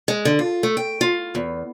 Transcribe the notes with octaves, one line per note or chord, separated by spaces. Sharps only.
G#3
D3
F4
A3
G5
F4
E2